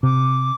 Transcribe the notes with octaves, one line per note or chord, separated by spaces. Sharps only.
C3 D6